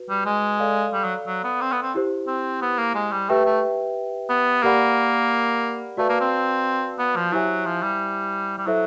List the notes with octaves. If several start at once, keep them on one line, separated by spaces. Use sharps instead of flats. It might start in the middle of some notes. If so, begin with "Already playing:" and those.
Already playing: F#4 B4
G3
G#3
A4 D5 F5
G3
F#3
F#3
B3
C4
B3
C4
E4 G4 C5
C4
B3
A#3
G#3
G3
A3 G4 B4 E5 G5
A3
B3
A#3 G4 A#4 D5 F#5 B5
A3 F#4 B4 D5 F5 A5
A#3
C4
B3
F3
F#3 E4 G4 C5 E5 G#5
F3
G3
G3
F#3 E4 A4 C5 E5